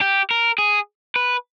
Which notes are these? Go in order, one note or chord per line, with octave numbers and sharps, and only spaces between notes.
G4
A#4
G#4
B4